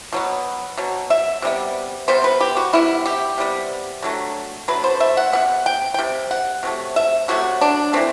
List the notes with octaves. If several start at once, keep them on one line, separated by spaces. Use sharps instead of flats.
B2 F#3 B3
B2 F#3
E5
C3 G3 B3
C3 G3 B3 C5
B4
G4
F#4
C3 G3 B3 E4
G4
C3 G3 B3
D3 F#3 A3
D3 F#3 A3 B4
C5
E5
F#5
C3 G3 B3 F#5
G5
G5
C3 G3
F#5
C3 F#3 A3
E5
C3 F#3 A3 F#4
D4
E3 A3 C4